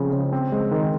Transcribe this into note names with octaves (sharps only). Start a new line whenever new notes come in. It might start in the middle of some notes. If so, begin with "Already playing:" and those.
Already playing: C#3 F3 G#3 C4
C#3
C4
G#3
D#3